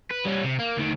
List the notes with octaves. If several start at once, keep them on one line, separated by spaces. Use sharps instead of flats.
B4
G3 C#4
C3
A#3
D2 D#3